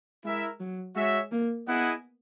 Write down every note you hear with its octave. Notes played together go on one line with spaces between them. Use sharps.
G#3 E4 A#4 E5
F#3
G#3 F#4 C#5 E5
A#3
B3 E4 G#4 D#5 F#5